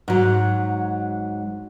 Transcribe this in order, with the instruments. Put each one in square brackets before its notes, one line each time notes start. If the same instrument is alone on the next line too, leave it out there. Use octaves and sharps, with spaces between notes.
[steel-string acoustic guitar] G#2 F#3